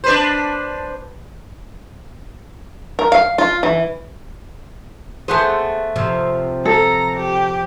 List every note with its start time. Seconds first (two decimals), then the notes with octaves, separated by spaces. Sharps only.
0.04 D4 B4 C5
2.99 A#4
3.12 F5
3.38 F4
3.63 E3
5.28 A3 B3 G#4 C5
5.96 C3 F3
6.65 A4 A#5
7.17 G4